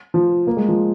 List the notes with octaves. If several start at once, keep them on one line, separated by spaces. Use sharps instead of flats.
F3
A#3
G#3
F3